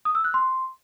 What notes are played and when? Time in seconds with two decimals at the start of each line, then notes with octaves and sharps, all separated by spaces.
0.05 D#6
0.15 E6
0.24 F#6
0.34 C6